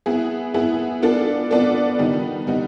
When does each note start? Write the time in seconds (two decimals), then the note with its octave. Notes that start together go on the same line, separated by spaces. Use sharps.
0.06 B3 E4 G#4
0.54 B3 E4 G#4
1.02 B3 D4 F4 A4 D5
1.51 B3 D4 F4 A4 D5
1.99 D#3 G3 B3 D#4
2.47 D#3 G3 B3 D#4